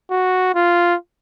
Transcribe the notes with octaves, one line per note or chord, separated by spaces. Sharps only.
F#4
F4